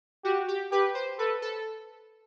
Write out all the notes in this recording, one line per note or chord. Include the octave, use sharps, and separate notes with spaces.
F#4 G4
G4
G4 B4
C5
A4 B4
A4